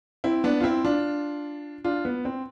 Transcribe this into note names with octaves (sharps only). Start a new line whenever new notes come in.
C4 E4
B3 D4
F4
C4 E4
D4 F4
D4 F4
B3
C4